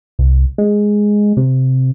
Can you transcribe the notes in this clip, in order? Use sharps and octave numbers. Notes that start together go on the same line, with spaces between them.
C2
G#3
C3